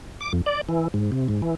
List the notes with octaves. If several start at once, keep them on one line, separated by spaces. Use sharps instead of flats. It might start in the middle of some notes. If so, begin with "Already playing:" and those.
D6
F2
D5
E3
G#2
C3
G#2
E3